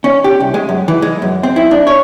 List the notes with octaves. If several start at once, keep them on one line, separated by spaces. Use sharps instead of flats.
C#4
G4
C2
G#3
F#2
E3
G#3
F#2
C4
E4
D4
C#5